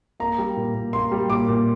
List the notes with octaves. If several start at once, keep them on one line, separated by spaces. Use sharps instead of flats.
A#3 A#5
G3
A#2
A#2
A#3 C6
G3
A#2 D6
A#2